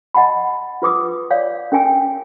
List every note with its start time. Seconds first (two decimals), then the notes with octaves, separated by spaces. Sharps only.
0.14 D#5 F#5 A5 B5
0.82 F4 B4 D6 D#6
1.31 C#5 D5 F5
1.72 C#4 A#4 G5 G#5 E6